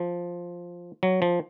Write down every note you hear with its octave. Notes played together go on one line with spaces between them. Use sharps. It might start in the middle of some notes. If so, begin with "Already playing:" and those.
Already playing: F3
F#3
F3